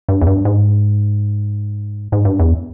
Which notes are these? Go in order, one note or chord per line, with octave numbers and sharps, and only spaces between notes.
G2
E2
G2
G#2
G#2
G2
E2